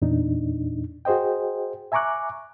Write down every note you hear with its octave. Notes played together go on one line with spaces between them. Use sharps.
E2 A#2 D4 D#4
F#4 G#4 C5 D#5 G5
E5 G#5 A#5 C#6 D6 F#6